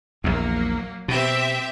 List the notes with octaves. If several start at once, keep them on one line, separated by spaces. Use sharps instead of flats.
A#1 E2 F#3 A#3
B2 C4 G4 E5